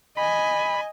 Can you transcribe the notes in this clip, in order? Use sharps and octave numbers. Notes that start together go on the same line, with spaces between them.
D#5 G#5 B5